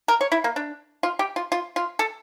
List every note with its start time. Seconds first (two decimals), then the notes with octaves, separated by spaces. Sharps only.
0.08 A#4
0.21 C#5
0.32 E4
0.44 A#3
0.56 D4
1.03 F4
1.19 G4
1.36 F4
1.52 F4
1.76 F4
1.99 A4